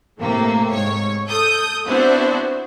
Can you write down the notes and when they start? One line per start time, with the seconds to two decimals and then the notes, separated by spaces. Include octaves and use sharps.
0.20 A2 C3 A3 A#3
0.71 G#2 C#5
1.28 A4 D#6 G6
1.87 B3 C4 D4 E4 F#4 C5